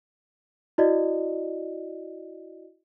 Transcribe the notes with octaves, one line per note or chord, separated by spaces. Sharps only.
E4 F#4 D5 D#5